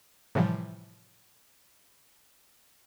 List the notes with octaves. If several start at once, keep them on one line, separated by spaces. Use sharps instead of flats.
A2 C3 E3 F3 G3